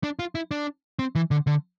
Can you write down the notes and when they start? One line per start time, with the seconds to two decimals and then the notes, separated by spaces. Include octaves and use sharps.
0.04 D4
0.19 F4
0.35 E4
0.51 D4
0.99 C4
1.15 E3
1.31 D3
1.47 D3